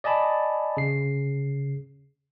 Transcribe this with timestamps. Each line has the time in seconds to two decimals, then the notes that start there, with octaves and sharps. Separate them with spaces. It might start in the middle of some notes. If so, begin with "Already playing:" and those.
0.04 D5 D#5 G#5 A5 B5
0.77 C#3 C7